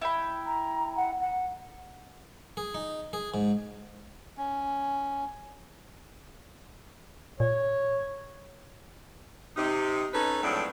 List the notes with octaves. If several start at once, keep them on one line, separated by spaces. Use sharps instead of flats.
E4 G5 B5
A#5
F#5
F#5
G#4
D#4
G#4
G#2
C#4
A#2 C#5
C3 D#4
C#4 D#4 A4 B4
A2 F3 F#3 G#3 C4 D4